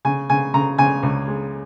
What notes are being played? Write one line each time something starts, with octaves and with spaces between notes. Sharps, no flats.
C#3 G#5
C#3 G#5
C#3 A#5
C#3 G#5
C#2
G#3